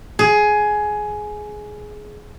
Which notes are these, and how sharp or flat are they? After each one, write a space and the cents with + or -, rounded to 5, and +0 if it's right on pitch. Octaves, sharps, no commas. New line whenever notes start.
G#4 +15